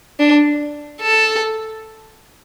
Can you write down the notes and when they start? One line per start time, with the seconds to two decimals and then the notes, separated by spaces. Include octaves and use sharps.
0.19 D4
1.01 A4